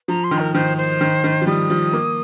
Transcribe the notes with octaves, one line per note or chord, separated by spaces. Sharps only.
F3 A#5
C6
D#3
A#4
D#3 C5
C5
D#3
D#3
F3
G3 D#6
F3
A#3